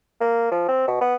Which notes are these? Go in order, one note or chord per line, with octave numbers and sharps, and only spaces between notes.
A#3
F3
C4
B2
B3